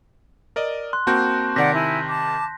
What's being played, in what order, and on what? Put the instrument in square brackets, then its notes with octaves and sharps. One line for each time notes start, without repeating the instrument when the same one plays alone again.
[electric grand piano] A#4 D5 D#5
[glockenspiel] C6 F#6
[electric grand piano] A#3 C4 F#4 [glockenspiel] A5 G6
[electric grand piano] C3 D#3 [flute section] D5 F#5 D6 [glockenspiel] A#6 B6
[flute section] E4 G#5
A5 D6